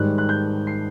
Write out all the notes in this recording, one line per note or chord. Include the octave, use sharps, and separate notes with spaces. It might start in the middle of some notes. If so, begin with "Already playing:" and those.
Already playing: G#2 D#3 G3 F#6
F#6
G6
C7